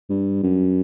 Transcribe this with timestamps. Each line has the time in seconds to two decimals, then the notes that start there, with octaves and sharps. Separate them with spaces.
0.10 G2
0.43 F#2